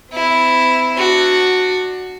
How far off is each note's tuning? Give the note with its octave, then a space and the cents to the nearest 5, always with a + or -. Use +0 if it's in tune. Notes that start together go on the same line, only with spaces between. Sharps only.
C4 -40 E4 +0
D4 +15 F#4 +0